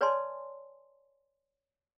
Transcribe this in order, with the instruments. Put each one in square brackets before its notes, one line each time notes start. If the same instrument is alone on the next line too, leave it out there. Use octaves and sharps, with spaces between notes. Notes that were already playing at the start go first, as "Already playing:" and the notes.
[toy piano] B4 C#5 D5 G#5 A5 C6